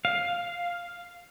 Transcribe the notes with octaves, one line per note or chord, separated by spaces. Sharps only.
F5